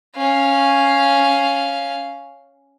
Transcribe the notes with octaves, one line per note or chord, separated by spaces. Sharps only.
C#4 F5